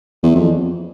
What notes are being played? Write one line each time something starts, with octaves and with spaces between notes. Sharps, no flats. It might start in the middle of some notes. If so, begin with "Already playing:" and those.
E2
F2